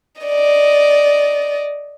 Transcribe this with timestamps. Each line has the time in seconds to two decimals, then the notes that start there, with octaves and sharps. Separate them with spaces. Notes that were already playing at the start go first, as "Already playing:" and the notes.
0.21 D5 D#5